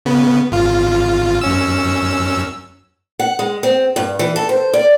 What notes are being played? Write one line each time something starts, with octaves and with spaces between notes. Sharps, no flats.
C#3 B3
G#1 F4
F#2 C#4 E6
F#5
G#3
C4
G2
E3
A4
C5
D5